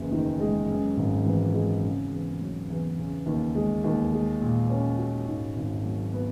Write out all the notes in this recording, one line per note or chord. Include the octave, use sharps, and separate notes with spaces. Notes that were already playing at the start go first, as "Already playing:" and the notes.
Already playing: F#1 E2
D#3
G#3
F#2
G#1
E3
G#3
C#3
E2
F#3
E2
C#3
D#2
G#3
D#2
G#3
A#2
C#4
F#4
G#2
G#1
F#3
B3